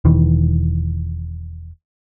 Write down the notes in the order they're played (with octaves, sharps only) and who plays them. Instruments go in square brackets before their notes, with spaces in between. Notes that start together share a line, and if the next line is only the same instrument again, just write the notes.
[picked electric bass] E1 D#3 E3